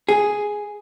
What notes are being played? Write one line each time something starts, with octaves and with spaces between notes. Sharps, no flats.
G#4